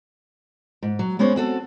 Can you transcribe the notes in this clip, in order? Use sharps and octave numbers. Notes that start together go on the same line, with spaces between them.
G#2
F#3
G#3 B3 C#4 C5 C#5
C4 F#4 A4